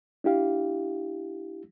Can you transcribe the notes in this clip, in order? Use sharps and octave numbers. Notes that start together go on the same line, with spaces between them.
D4 E4 G4 F5